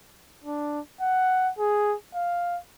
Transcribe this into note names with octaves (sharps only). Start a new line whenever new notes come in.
D4
F#5
G#4
F5